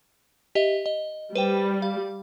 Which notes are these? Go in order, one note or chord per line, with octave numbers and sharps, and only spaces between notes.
G4 D#5 E5
D#5
G3 B4 C5 G5
F5